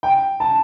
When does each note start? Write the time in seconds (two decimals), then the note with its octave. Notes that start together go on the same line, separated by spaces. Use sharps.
0.03 G5
0.40 A5